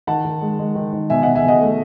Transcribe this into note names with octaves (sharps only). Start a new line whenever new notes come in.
D#3 F#5 A5
D#3
G#3
G#3
D#3
D#3
B2 E5 G#5
B2 D#5 F#5
E5 G#5
B2 D#5 F#5
A3